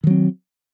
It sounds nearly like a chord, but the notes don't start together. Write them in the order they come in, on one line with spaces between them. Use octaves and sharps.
D#3 F#3 C4